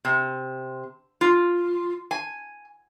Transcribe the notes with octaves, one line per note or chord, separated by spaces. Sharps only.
C3
F4
G#5